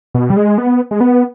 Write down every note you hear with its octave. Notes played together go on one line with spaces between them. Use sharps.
B2
G3
G#3
B3
G#3
B3